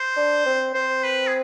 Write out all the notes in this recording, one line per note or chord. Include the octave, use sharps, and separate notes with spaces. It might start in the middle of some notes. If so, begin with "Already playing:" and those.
Already playing: C5
D4
C4
C4 C5
B4
G#4